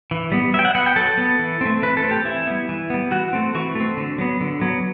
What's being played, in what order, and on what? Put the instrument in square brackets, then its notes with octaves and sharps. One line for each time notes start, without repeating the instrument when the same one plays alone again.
[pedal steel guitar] E3
G3 B3
F#3 E5
G5
F#5
B3 F#5
G5
F#3 A4
B3
E3
A3 C4
E3 B4
A4
A3 C4
G4
E3 E4
G3 B3
E3
G3 B3
E3 F#4
A3 C4
E3 F#4
A3 C4
D3
F#3 B3
D3
F#3 B3